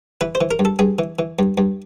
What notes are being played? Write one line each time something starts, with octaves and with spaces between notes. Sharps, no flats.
E3 B4
C5
E3
A#4
G2
A4
G2 G#4
E3
E3
G2
G2